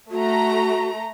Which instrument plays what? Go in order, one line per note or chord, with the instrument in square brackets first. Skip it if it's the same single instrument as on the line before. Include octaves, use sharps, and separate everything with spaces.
[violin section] A3 A#5 [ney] F#4